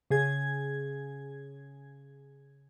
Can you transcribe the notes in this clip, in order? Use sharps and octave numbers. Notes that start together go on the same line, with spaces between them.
C#3 G#4 G#6